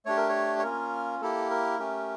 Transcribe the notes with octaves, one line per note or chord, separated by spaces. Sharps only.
A3 D4 G4 C#5
A#4
C#5
C#5
A#3 C#4 F4 A#4
A#3 E4 G4 A4
A#4
A3 C#4 G4